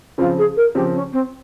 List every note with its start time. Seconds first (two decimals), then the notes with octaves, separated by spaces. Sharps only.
0.18 C#3 F3 C4 F4
0.37 G#4
0.56 A#4
0.75 C#3 F3 C4 G4
0.94 C#4
1.12 C4